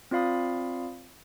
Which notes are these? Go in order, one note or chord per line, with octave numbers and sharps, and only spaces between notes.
C4 F4 D5 F5 B5 D#6